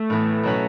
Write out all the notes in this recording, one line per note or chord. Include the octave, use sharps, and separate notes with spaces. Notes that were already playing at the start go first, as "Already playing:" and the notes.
Already playing: A3
A2 E3 B3
B2 F#3 C#4 F#4 B4